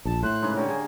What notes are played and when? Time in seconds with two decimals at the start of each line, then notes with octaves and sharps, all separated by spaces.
0.05 A#1 A5
0.23 A2 C5 F#6
0.42 G#2 C#3 B4
0.56 D3 G4 A#4 C#5
0.69 A#3 G#4